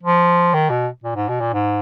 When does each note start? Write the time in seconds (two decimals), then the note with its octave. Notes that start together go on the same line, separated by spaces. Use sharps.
0.03 F3
0.54 D#3
0.70 B2
1.04 A#2
1.16 G#2
1.29 B2
1.40 A#2
1.54 G#2